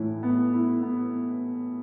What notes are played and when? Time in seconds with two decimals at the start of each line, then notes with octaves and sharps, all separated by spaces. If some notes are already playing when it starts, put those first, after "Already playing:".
Already playing: A2 E3 E4
0.23 B3
0.53 E4
0.83 B3